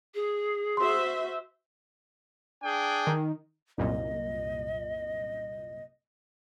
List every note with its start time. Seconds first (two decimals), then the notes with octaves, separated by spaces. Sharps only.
0.15 G#4
0.77 F#4 C5 E5 C6
2.63 D4 G#4 G5
3.07 D#3
3.78 C2 F#2 A#2 D#5